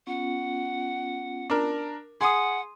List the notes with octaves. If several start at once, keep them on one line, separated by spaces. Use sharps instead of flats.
B3 C#4 F4 F#5
D4 A#4
G#4 F#5 C6 D#6